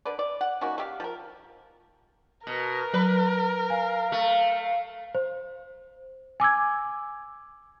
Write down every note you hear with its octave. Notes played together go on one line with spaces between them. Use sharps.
D3 B4 D5
D5
F#5
D#3 A#3 C#4 F#4
A3 G4 F5
F3 A#4
B2 A#4
F#3 B4 B5
F5 G#5
A3
C5
G#5 D6 E6 G#6